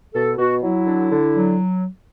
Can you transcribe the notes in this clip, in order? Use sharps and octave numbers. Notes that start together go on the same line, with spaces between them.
B2 A4
B2 F#4
F#3 E4
D3
D3
F#3